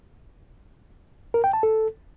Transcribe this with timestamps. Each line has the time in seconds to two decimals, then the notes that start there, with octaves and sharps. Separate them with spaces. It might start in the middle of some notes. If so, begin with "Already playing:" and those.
1.34 A#4
1.44 G5
1.53 A5
1.63 A4